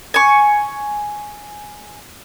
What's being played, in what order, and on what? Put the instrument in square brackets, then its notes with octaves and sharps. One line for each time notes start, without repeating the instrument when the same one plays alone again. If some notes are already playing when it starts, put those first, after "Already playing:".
[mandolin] G#5 C#6